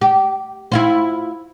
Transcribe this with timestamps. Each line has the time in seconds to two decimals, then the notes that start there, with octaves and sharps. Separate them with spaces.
0.01 G4
0.72 E4 F4 C5